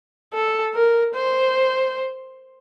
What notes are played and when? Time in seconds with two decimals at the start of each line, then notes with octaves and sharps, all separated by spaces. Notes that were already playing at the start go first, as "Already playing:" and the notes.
0.33 A4
0.74 A#4
1.14 C5